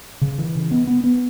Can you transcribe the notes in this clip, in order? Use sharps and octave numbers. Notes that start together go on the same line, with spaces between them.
C#3
E3
C#3
B3
B3
B3